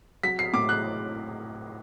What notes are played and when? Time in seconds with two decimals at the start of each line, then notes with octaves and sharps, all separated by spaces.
0.23 F#3 B6
0.39 C7
0.53 A2 D6
0.69 F#6